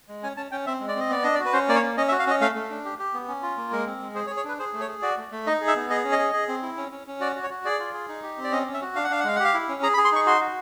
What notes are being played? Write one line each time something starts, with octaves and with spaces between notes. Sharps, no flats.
G#3
C#4 G#5
C#4 A5
C#4 G5
C4 E5
G#3
D5
C4 D#5
B3 D5
D4 D#5
D5
F#4
B4
C#4 C5
A#3 D5
C#5
C#4
C#4 D#5
E5
F#4
F5
C#4 D#5
A3 F5
A3
D4
G4
G4
B3
C#4
F4
A#3
G#3 A#4
C4
G#3
G#4 C5
C#5
G#4
C#5
D4 B4
G#4 C5
A3
C#5
G#4
F#4 D5
A3
A3
D#4 D#5
G#4
E5
B3
G#4 D#5
C#4
D#5
G#4
G#4
C4
E4
C#4
C#4
C#4
F#4 D5
F#4
C#5
F#4
G#4 D5
F4
G#4
D#4
G4
C4
D5
C#4 D#5
C#4
E5
F#4
D4 F5
F#5
D4 F5
F#5
G#3 F5
F#5
G4
F5
E4
C#4
G#4 A#5
B5
G#4
C6
D#4 C#6
F#4 C6
F#4